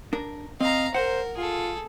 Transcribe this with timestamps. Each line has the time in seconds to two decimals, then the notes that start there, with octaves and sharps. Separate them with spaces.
0.13 D4 A#4
0.61 C4 D#5 F5 A#5
0.94 A#4 C5 F#5
1.37 F4 G#4 A4